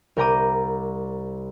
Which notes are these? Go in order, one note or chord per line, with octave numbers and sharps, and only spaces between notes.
C2 A#4 G5 A#5 D6 D#7